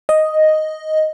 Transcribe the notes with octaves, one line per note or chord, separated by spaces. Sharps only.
D#5